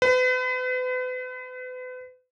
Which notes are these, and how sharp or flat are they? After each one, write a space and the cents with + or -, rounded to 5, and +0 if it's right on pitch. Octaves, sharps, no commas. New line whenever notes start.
B4 +40